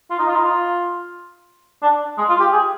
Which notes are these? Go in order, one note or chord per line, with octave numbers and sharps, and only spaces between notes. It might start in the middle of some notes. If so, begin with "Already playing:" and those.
F4
D#4
F4
D#4
F4
D4
G#3
F4
G4
G#4